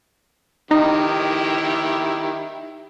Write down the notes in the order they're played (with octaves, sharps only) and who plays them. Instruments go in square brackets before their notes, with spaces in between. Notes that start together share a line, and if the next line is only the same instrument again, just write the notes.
[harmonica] D#3 E4 G4 [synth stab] D#4